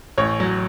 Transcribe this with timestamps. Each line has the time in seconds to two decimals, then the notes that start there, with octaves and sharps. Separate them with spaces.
0.18 A1 C#5
0.40 F#3